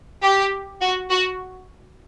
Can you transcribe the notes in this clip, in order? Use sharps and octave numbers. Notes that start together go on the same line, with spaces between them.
G4
F#4
F#4